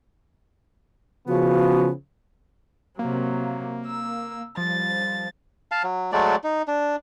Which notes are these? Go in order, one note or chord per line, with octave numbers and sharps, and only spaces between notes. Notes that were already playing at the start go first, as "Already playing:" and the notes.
C#3 F3 B3 F#4
C3 F#3 A#3
E6
F3 G3 A6
F5 A5
F#3
F#3 G#3 A3 D5
D#4
D4